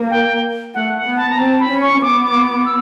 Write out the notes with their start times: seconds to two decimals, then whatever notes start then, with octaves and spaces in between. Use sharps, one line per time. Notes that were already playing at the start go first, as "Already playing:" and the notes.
Already playing: A#3
0.11 G5
0.74 A3 F#5
0.96 F#5
1.06 B3
1.16 A5
1.30 A#5
1.38 C4 A5
1.60 B5
1.70 C#4
1.81 C#6
2.02 B3 D6
2.23 D6
2.44 D6
2.66 E6